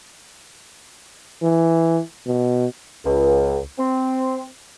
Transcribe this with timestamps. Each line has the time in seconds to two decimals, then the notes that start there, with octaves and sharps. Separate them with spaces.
1.42 E3
2.26 B2
3.05 C#2
3.78 C4